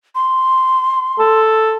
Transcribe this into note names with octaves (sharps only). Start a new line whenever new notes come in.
C6
A4